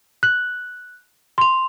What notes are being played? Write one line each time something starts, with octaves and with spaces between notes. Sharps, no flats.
F#6 F#7
C6 F7